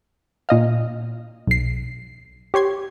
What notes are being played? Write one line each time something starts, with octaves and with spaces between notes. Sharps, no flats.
A#2 D#5 F5
B1 C7
G4 C#5 C6 G#6